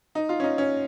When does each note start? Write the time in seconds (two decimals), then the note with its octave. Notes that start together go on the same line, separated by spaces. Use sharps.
0.15 D#4
0.29 F4
0.40 C#4
0.44 D#4
0.58 C#4